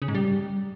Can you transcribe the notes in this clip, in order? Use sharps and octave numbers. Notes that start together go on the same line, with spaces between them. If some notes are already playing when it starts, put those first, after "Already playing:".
C#3
G#2
G3